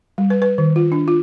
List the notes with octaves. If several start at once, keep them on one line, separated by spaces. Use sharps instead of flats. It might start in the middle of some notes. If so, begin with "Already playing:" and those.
G3
B4
B4
D#3
F4
D4
F4